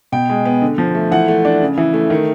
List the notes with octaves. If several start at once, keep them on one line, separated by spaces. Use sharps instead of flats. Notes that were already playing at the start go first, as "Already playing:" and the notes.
B2 G5
G#3
B3
D3
F3
A3
E3 F#5
A3
D4
C#3
E3
A3
D#3